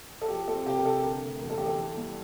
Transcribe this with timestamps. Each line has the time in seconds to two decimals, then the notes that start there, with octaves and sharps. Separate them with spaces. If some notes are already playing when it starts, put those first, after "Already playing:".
0.21 A4
0.28 F3 G4
0.48 C4 A4
0.66 C3 G4
0.76 A#4
0.85 C3 A4
1.04 D3 A#4
1.23 A3
1.41 E2 A#4
1.50 A4
1.58 E2 G4
1.66 A4
1.79 E3
1.97 G3